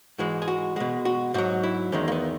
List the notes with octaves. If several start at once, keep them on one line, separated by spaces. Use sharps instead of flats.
G#2 E3 G#3 F#4
G#4
F#4
B2 G#3 F#4
F#4
G#2 F#3 F#4
E4
E2 D#3 G#3 C#4
A#3
B3